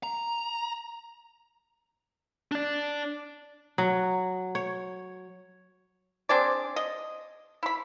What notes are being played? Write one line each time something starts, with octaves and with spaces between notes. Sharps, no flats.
A#5
D4 D5
F#3
C#5
C4 D4 G#4 D5
D#5
E4 B5